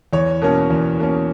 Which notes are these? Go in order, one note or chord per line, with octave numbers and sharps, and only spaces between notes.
E2 C#5
B2 A#3 C#4
E2
B2 A#3 C#4